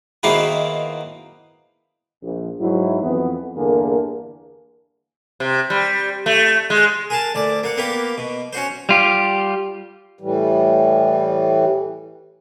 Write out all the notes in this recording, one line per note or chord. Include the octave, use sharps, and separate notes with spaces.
B2 D#3 A#3 C4 E4 G#4
A#1
G#2 F#3 E4
F2 E3 B3
E2 G2 D3 A#3 G#4 A#4
C3
G3
A3
G#3
G#4 A#4 A5
D2 D5
A#3 F#5
A#3 B3 G4 A#4
B2
C#4 F#4 C5
G3 F4 G4
A2 E3 G3